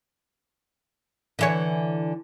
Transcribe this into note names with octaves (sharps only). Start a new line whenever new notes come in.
D3 E3 C#5